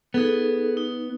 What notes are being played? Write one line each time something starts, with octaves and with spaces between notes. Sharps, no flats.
B3 D#4 G#4 A4
D#4